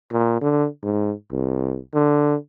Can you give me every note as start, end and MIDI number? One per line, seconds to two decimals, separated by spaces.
0.12 0.37 46
0.42 0.67 50
0.83 1.13 44
1.31 1.79 36
1.94 2.35 50